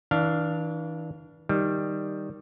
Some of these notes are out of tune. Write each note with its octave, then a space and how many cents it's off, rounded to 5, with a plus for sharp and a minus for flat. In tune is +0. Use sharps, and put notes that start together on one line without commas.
E3 -35 D4 +0 F5 -5
D#3 +0 G3 +0